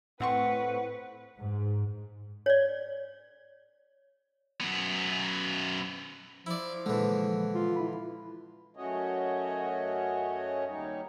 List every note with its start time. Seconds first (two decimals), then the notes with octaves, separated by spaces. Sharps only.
0.20 A2 C4 B4 F#5 C#6
1.40 G#2
2.46 C#5 D5
4.61 F#2 B3
6.46 F3 E4 D5
6.86 A#2 D3 E3 G#3
7.55 F4
7.76 E4 B5
8.77 F#2 A3 C#4 F#4 C#5 D#5
10.68 D#2 G3 D#4 C#5